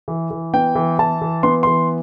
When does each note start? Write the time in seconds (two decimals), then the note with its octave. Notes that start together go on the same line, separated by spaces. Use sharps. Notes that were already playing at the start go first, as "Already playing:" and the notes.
0.08 E3
0.31 E3
0.53 B3 G5
0.75 E3
0.99 E3 A5
1.21 E3
1.43 B3 C6
1.63 E3 C6